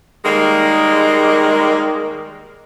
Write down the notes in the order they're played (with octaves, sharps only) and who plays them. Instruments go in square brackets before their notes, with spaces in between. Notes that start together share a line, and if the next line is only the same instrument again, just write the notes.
[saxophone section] D#3 G3 G#3 A#3